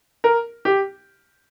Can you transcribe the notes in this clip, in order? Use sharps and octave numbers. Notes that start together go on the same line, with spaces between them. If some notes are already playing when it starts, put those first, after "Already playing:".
A#4
G4